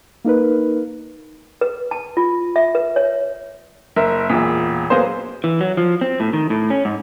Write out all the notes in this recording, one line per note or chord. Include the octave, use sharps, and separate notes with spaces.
A#3 D#4 A#4 B4
B4
A5
F4
E5
B4
C#5
F#1 A#4 E5
E1 A#2 G#4 B6
F#3 A#3 B3 G#4 C5
E3
F#3
F3
C4
A2
D#3
A2
C#4
G#2